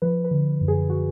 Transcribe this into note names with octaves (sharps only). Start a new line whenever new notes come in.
F3 B4
B4
D3
F#2
G#4
F#4